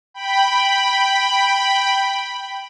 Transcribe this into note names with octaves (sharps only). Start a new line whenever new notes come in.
G5 B5